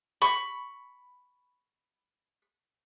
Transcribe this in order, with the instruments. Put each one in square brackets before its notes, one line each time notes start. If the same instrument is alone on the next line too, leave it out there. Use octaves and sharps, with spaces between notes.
[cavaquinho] B5 C#6